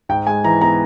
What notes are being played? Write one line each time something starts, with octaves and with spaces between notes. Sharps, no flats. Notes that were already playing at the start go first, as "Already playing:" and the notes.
G#2 G5
G#3 G#5
E3 A#5
B3 A#5